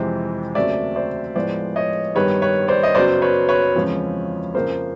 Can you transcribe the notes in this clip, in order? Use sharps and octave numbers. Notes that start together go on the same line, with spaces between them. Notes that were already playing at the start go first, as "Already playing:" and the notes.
Already playing: F2 C3 E3 G#3 C4
D#2 C#3 F#3 A3 C4 D5 E5
C5 D5
A2 F3 G#3 B3 C5 D5
C#5 D#5
G2 D#3 G3 B3 B4 C#5
B4 C#5
C5 D5
D#5
F#2 C#3 F#3 B3 C5 D5
B4 C#5
B4 C#5
E2 C#3 F3 G#3 C4
F2 C#3 F3 A#3 A#4 C5